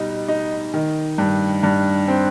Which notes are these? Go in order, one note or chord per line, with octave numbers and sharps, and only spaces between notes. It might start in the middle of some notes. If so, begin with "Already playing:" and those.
Already playing: B2 G3 D#4
D#4
D#3
G2
G2
C4